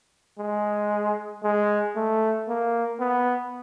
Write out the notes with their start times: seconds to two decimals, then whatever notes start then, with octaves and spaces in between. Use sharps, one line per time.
0.39 G#3
1.44 G#3
1.96 A3
2.48 A#3
3.00 B3